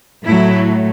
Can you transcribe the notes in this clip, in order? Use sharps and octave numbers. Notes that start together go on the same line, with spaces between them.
A2 F#3 A3 E4